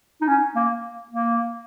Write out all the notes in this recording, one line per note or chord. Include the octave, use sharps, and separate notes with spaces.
D#4
C#4
A#3
A#3